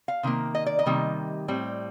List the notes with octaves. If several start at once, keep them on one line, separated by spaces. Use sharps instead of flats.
F5
C3 D#3 A#3
D#5
D5
D#5
C3 D#3 G3 A#3
A2 G3 C4